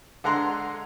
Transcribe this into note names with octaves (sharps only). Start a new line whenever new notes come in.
D3 G#3 F#5 A#5 C6